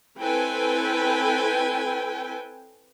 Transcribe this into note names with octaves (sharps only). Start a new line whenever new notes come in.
C4 E4 A4 B4 G5 G#5